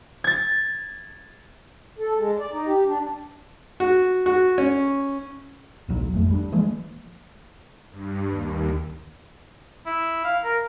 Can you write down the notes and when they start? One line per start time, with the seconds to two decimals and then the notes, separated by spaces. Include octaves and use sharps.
0.24 G#6 A6
1.99 A4
2.17 G#3
2.40 D5
2.53 D#4
2.67 G4
2.86 D4
3.80 F#4
4.26 F#4
4.58 C#4
5.89 D#1 A#1 F#3
6.13 G#1 F2 A3
6.30 G3 D4
6.52 E3 F3 G#3 A#3
7.91 G2
8.29 D#2
9.86 E4
10.25 F5
10.44 A#4